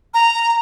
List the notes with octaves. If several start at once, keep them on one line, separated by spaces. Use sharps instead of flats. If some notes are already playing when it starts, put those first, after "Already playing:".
A#5